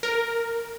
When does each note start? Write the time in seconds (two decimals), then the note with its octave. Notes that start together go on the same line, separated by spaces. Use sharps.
0.03 A#4